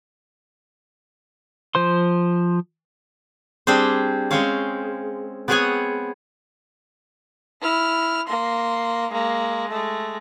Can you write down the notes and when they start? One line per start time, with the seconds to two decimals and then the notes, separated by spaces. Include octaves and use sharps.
1.75 F3 C5 C6
3.67 G3 C4 D4 G#4 C5
4.31 G#3 C4 C#4 C5 C#5 F5
5.48 B3 C4 G#4 C#5 F#5 G#5
7.61 E4 F6
8.27 A#3 C6
9.11 G#3 A#3
9.71 G#3 A3